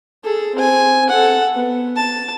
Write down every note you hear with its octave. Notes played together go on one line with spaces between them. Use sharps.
G#4 A4
C4 G#5
A4 F#5
B3
A5